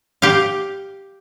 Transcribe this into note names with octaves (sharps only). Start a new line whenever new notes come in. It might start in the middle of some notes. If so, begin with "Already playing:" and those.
G4 F5